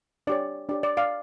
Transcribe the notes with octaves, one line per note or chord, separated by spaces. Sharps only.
D4 G4 C#5 D5
D4 G4 C#5 D5
D5
D5 F5